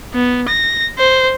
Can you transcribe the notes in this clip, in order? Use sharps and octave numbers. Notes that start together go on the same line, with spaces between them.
B3
A#6
C5